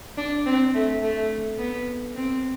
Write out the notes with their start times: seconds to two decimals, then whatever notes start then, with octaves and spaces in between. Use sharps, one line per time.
0.18 D4
0.46 C4
0.74 A3
1.03 A3
1.59 B3
2.16 C4